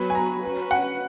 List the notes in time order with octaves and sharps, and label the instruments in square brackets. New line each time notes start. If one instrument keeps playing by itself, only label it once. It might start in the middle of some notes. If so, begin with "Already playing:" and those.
Already playing: [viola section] F#3 B3 F#4 B4 [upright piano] B5
[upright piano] G#5
A#5
[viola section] C#4 F#4 B4
[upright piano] F#5